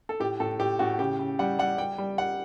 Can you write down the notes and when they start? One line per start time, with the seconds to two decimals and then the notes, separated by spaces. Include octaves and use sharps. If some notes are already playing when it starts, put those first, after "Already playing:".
0.09 A4
0.20 A2 G4
0.40 A2 A4
0.60 A2 G4
0.79 A2 F#4
0.99 C#3 G4
1.19 C#3
1.39 G3 F#5
1.59 G3 F#5
1.78 G3 G5
1.98 G3
2.18 G3 F#5